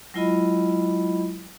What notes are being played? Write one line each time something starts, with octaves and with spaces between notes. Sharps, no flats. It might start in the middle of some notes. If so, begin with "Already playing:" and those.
F#3 G#3 E4 F4 D#5 B5